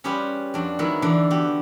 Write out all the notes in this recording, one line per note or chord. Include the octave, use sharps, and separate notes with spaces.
G3 C#4 F4 G4 G#4 B4
F2 D4 F#4
D#3 F#3 G#3 B3 E4
D3 E3 D4
B3 F#4 G4